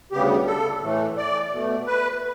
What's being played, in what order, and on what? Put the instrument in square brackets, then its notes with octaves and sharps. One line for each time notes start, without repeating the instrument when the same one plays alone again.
[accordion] D2 C#3 G3 B3 G4
A4
A2 E3 A3
D5
B2 A3
B4